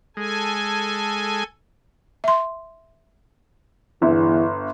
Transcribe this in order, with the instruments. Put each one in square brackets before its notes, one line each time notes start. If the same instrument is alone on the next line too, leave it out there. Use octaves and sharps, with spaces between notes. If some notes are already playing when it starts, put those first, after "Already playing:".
[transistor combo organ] G#3 [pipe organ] A4 G#5
[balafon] E5 C6
[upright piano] G1 [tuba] E2 [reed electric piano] E4